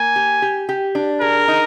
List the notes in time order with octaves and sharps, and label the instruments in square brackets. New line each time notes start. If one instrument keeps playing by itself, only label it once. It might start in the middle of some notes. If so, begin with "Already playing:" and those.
Already playing: [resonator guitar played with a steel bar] A#3 [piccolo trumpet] G#5
[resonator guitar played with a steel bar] G4
G4
G4
D4
[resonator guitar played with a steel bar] G#4 [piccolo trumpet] A#4
[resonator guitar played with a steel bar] D#4